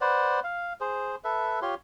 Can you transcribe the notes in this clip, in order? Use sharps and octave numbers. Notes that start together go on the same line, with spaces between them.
B4 C5 D5 F#5
F5
G#4 C5
A4 B4 E5
F4 G4 C#5 C6